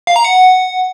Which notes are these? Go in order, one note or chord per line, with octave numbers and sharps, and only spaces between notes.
F5
A#5
F#5